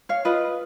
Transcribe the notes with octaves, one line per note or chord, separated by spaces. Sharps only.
C#5 F5
F4 B4 D#5